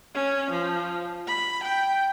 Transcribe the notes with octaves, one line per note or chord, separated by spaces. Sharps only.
C#4
F3
B5
G5